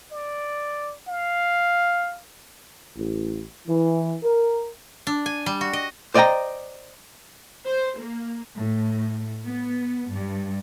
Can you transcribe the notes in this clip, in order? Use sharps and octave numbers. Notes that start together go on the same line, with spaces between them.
D5
F5
A1
E3
A#4
D4
G#5
G3
F#4
D#5
C5 D5 D#5 F5 G5 A#5
C5
A#3
A2
B3
G2